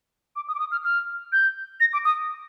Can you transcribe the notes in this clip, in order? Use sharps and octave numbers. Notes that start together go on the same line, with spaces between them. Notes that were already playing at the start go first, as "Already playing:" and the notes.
D6
D#6
D6
D#6
F6
F6
G6
A#6
D6
D#6